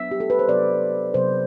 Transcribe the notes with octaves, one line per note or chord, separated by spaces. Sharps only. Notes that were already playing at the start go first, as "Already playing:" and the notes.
Already playing: F#3 B3 D4 E5
G4
A4
B4
C5
C3 F#3 B3 D5
C3 F#3 B3 C5